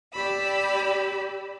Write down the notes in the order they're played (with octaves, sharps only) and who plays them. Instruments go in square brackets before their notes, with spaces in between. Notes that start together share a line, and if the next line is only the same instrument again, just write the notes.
[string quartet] G4 D5 B5 E6